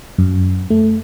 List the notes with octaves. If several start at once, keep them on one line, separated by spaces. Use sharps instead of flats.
F#2
A3